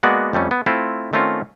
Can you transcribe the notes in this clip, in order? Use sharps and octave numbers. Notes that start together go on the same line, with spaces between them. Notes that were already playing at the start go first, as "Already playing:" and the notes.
G#3 A#3 B3 F#4 D5
F2 G3 A3 C#4
B3
A3 C4 E4 F4
D#3 A3 C4 C#4 F4